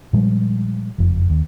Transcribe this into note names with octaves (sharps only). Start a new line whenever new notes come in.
A#2 F3 G3 G#3
F#1 F2 F3
D#2